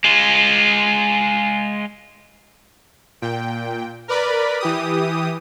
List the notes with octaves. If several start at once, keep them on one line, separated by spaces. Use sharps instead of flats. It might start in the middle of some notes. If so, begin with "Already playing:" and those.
G#3 F4
A#2 G5
A#4 B4 D5 B5
E3 G4 D#6